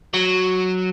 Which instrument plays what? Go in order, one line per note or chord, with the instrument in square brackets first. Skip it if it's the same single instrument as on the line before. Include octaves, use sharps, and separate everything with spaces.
[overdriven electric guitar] F#3